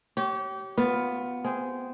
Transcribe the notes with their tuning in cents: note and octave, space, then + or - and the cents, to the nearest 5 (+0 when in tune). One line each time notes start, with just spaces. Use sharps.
G4 -30 C#5 +0
B3 +0 F4 +15
C4 -15 G#4 -5